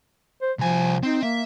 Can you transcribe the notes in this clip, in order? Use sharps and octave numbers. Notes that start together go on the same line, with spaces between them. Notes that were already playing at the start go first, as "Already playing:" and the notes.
C5
C2 F3 G#5
C4 D#4
A#3 E5